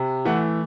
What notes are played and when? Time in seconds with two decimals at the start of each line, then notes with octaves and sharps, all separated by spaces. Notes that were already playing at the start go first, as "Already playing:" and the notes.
Already playing: C3
0.25 E3 A3 F#5